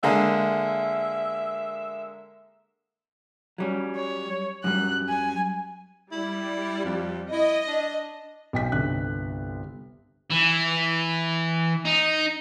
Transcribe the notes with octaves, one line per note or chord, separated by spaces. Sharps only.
D3 G#3 A#3 E5
F#3 G3 C#4
C#5
F#2 G3 F#6
G#5
G3 E4
F2
E4 D#5
D4
B1 G5 B6
G1 C2 D3 F#6
E3
D#4